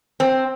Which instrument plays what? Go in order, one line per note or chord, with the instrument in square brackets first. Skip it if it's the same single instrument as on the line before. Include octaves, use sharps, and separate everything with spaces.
[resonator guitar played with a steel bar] C4